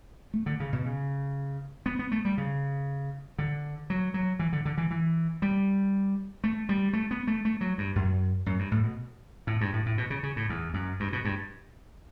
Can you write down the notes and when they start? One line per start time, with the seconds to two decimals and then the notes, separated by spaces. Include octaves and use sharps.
0.34 A3
0.46 D3
0.60 C#3
0.73 B2
0.85 C#3
1.86 B3
1.99 B3
2.12 A3
2.25 G3
2.38 C#3
3.39 D3
3.90 F#3
4.14 F#3
4.39 E3
4.53 D3
4.65 D3
4.78 E3
4.91 E3
5.42 G3
6.44 A3
6.69 G3
6.93 A3
7.11 B3
7.27 A3
7.45 A3
7.61 F#3
7.78 G2
7.96 F#2
8.46 F#2
8.59 G2
8.72 A2
8.84 B2
9.47 A2
9.61 G2
9.73 A2
9.86 A2
9.98 B2
10.10 C#3
10.23 C#3
10.36 A2
10.50 E2
10.74 F#2
11.00 G2
11.13 B2
11.25 G2